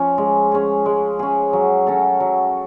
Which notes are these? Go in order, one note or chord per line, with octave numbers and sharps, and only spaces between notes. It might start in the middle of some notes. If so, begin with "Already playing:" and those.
Already playing: F3 C#4
G#3
C#4 G#4
G#3
C#4 G#4
F#3
C#4 F#4 A4
F#3